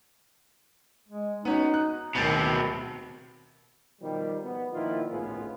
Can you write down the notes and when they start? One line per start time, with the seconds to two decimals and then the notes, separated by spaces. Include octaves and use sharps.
1.08 G#3
1.45 B3 C#4 D#4 F#4
1.74 F#6
2.15 D1 B2 D#3 C4 A6
4.02 B2 D#3 F3 G3
4.44 B3
4.73 A#2 D#3 F3 E4 F4
5.12 G#1 C#2 A2 B3 F4 G#4